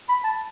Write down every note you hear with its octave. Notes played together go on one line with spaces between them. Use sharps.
B5
A5